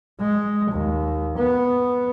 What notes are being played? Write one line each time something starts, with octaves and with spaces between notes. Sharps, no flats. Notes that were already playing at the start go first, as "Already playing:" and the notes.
G#3
D#2
B3